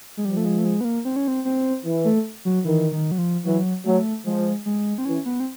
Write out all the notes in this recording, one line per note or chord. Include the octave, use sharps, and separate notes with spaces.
G#3
F3 G3
A3
G#3
A3
G#3
B3
A#3
C4
C#4
C4
C4
E3
A3
F#3
D#3 E3
D#3
F#3
F3
E3 F#3
F#3 A3
F3 G#3
G#3
C4
E3 C#4
B3
C4